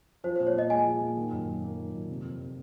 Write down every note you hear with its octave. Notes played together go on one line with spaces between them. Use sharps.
F3 C5
A#2 C5
C#5
A#2 D#5
G#3 G#5
F3
A#2
D#3
F#2
F#2
A#3
D#3
F#2
C3
F2
A#3